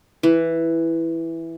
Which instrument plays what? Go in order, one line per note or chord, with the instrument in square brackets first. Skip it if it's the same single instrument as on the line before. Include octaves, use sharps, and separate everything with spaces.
[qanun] E3